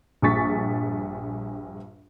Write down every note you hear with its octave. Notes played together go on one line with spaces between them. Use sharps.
A#1 G2 G#4 C#6 A6 B6